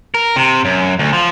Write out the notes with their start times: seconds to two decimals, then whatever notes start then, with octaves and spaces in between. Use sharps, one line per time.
0.14 A#4
0.36 C3
0.65 F#2
0.99 D2
1.13 F3